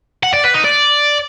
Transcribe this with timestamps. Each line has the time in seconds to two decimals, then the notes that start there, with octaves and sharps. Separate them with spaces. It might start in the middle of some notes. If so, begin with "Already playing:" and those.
0.23 F#5
0.33 D5
0.44 B4
0.54 D#4
0.64 D5